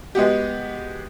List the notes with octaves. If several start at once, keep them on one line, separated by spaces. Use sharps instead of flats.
G#3 B3 F#4 G4